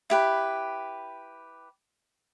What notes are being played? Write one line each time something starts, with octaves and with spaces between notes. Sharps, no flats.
E4 G4 B4